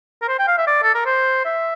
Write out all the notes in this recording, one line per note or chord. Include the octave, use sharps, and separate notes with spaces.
A#4
C5
G5
F5
E5
D5
A4
A#4
C5
E5